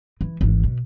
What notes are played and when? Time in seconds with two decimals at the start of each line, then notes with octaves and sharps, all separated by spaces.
0.21 E3
0.41 G#1 E3
0.64 B2